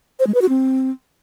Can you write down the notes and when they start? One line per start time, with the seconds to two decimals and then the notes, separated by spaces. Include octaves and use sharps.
0.19 C5
0.27 G#3
0.34 B4
0.42 F#4
0.49 C4